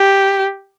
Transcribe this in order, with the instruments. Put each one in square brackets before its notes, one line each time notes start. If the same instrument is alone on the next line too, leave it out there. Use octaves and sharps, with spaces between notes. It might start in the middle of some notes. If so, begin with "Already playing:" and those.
Already playing: [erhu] G4